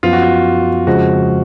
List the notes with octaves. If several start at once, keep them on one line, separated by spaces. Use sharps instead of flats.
F#2 F3 B3 F4
F#4
F4
F2 C#3 F3 G#3 F#4